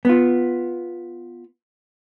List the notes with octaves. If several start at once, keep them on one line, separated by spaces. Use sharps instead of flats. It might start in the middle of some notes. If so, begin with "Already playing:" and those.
B3 F4